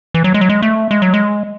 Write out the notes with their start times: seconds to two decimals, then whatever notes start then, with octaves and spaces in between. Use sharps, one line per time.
0.14 E3
0.24 F#3
0.34 G#3
0.41 F#3
0.49 G#3
0.62 A3
0.91 G#3
1.02 F#3
1.14 G#3